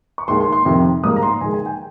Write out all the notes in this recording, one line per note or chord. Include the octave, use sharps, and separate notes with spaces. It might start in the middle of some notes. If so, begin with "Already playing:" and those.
C#6
D#2 D#3 G#3 C6
C6
C6
F2 C3 D#3
G#2 G3 A#3 D#6
A#5
C6
D#2 D#3 G#3 G#5
G#5
G5